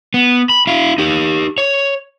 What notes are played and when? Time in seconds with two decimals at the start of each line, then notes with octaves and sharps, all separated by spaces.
0.14 B3
0.50 B5
0.67 E4 F5
0.98 D#4 G4
1.58 C#5